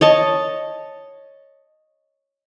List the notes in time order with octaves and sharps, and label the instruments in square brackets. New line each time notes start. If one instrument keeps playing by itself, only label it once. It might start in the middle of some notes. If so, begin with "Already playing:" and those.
[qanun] C#5 D#5 A5